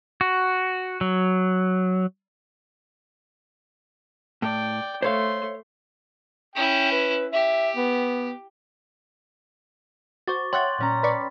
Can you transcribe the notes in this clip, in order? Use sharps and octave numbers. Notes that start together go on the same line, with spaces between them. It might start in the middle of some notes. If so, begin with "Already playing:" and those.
F#4
F#3
A2 D5 G5
A3 C5 C#5 F5 C6
C#4 E4 G5
B4
G4 E5
B3
F#4 C5 C#6 D6 A6
C#5 E5 F#5 G5 C6 F#6 A6
A#2 C#4 A#5
B4 D5 B5 C#6